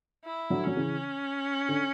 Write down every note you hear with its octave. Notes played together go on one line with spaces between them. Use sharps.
E4
D3 F#3
F#3 C#4
C#3 E3
D3